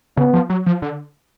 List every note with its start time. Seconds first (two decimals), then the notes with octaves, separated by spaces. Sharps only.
0.17 C#3 B3
0.34 F3
0.50 F#3
0.66 F3
0.82 D3